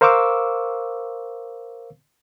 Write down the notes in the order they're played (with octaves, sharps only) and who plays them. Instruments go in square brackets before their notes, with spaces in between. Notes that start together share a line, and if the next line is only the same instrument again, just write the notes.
[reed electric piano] A#4 C5 F5 C#6 D6 E6